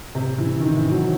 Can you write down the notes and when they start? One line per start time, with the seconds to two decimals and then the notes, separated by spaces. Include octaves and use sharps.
0.15 C3
0.38 E3
0.60 D#3
0.76 E3
0.91 F#3